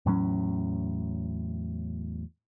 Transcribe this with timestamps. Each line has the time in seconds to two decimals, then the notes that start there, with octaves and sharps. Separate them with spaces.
0.06 E2 A2 F#3 C#4